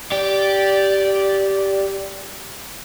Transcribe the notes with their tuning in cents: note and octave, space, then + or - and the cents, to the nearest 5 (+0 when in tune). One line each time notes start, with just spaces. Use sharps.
G4 -5 D5 -10